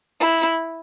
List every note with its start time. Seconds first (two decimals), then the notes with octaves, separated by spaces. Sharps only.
0.21 E4